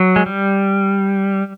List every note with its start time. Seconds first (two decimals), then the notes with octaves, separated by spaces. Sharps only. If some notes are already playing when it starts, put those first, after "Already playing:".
Already playing: F#3
0.16 G#3
0.26 G3